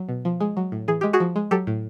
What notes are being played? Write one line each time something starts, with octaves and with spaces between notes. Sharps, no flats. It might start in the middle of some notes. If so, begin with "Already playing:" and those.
Already playing: F#3
B2
F3
G#3
F#3
A2
E3 G#4
G#3 G4
F#4 G#4
F3
G#3
F#3 G4 A4
A2